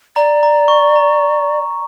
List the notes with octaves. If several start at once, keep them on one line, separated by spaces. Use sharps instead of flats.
D5 A#5
A#5
C#6
A#5